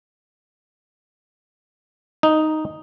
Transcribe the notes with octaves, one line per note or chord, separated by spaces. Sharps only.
D#4